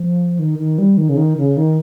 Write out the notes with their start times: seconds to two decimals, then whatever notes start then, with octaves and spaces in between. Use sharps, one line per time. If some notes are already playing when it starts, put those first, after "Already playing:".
Already playing: F3
0.39 D#3
0.59 D#3
0.78 G3
0.97 D#3
1.09 C#3
1.17 D#3
1.37 C#3
1.57 D#3